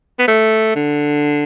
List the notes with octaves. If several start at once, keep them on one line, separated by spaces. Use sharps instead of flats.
B3
A3
D3